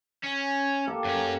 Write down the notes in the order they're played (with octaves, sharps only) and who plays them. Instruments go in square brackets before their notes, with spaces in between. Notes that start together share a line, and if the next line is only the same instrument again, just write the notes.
[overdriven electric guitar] C#4
[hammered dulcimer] A#3 G4 A4
[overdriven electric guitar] F#2 C#4